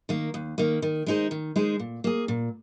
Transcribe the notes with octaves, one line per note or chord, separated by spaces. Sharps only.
D#3 A#3
D#2
D#3 A#3
D#3
G#3 D#4 G#4 C5
D#3
G#3 D#4 G#4 C5
A#2
A#3 G#4
A#2